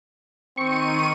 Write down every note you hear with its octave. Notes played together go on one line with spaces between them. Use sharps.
D#3 C4 C#6 D#7